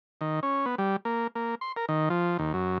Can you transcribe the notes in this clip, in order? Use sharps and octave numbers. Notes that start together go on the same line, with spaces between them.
D#3
C#4
B3
G3
A#3
A#3
C6
A#4
D#3
F3
D#2
F#2